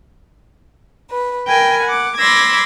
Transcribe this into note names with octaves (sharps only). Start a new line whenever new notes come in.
B4
A#4 G5 G#5 B5
F#5 D6
B5 C6 D6 E6 G#6 A#6